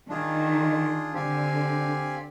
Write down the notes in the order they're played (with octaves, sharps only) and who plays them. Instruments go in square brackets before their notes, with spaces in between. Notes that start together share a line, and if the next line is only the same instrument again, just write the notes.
[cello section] D#3 [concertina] D4 F4 G#4
[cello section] D3 [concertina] C4 G4 D5 F5 G#5